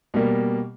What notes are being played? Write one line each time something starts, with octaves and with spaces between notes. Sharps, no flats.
B2 G3 A#3